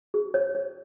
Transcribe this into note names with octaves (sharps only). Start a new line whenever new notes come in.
G#4
C#5
C#5